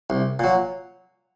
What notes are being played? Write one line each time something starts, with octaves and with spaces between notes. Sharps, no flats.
C2
A#2 F#3